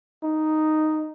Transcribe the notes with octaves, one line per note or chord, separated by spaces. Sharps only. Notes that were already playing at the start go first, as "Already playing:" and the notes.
D#4